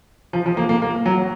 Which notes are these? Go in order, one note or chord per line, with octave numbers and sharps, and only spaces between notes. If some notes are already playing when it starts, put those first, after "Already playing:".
F3
F3
A#3
A#3
A#3
F#3